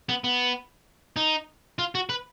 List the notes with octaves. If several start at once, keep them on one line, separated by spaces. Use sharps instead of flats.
B3
B3
D#4
F4
F#4
B4